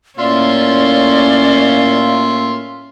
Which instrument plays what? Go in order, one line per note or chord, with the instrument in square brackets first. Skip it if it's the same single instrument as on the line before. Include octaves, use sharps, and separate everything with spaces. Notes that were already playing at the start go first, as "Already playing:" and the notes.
[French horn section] A2 A#3 [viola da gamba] C#4 [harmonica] F4 E5 C6 [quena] D5